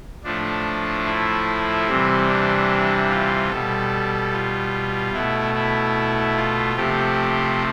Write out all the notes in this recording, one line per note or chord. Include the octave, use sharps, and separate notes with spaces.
A2 F3 A3 D4
E4
C3 E3 G3 C4
D4
F4
B2 G3 A4
F4
B2 A3 E4
E4
F4
C3 F3 A3 G4